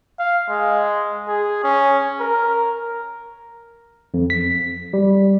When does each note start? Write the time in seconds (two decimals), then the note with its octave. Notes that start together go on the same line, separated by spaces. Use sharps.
0.19 F5
0.50 G#3
1.28 G#4
1.64 C#4
2.21 A#4
4.14 F2
4.30 B6
4.93 G3